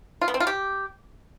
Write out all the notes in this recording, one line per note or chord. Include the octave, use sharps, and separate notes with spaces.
F4
B3
C4
F4
G4